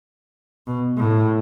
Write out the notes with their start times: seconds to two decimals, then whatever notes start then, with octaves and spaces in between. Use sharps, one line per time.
0.67 B2
0.98 A2